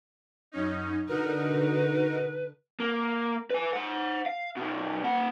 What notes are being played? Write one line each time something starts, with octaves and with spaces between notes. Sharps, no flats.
F#2 C#4 D#4
D3 D#4 F#4 A#4 B4
A#3
B4 G#5
C5 F#5
F5
B2 D#3
A#3 F#5